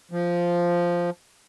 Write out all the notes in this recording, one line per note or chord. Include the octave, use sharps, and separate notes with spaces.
F3